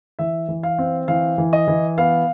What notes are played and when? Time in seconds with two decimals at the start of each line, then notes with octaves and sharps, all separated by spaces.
0.19 E3 E5
0.49 E3
0.63 F5
0.78 C4
1.08 E3 F5
1.38 E3
1.53 D#5
1.68 E3
1.98 B3 F5